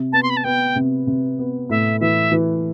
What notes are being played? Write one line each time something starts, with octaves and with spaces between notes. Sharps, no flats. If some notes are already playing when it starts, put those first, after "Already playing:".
Already playing: C3
B3 A5
C6
B5
A5
B3 G5
C3
C3
B3
A2 E5
E3 E5
E3